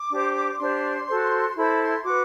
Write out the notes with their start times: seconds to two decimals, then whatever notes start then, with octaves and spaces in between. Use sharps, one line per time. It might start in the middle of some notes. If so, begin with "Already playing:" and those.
Already playing: D6
0.10 D4 G4 C5
0.59 D4 G4 C5 C6
1.07 F#4 A4 C5
1.48 C6
1.55 E4 A4 C5 B5
1.79 C6
2.04 F#4 B4 D6